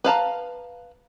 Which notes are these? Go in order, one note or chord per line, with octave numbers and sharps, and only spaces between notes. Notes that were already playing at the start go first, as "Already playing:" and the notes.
B4 F5 A5 A#5